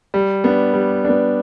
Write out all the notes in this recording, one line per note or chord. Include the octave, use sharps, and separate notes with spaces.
G3
B3 D4
G3
B3 D4